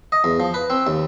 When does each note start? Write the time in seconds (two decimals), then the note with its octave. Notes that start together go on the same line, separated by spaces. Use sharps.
0.12 D#5
0.24 E2
0.40 F3
0.54 B4
0.70 C4
0.87 D#2